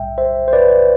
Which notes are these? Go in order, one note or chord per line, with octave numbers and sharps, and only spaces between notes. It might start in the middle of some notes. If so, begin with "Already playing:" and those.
Already playing: B1 A2 G3 E5 G5
C5 E5
C5
B4 D5